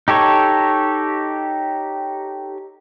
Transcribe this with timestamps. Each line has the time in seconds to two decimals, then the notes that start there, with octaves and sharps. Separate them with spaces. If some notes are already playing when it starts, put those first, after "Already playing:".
0.08 D#4 G4 A4 C#5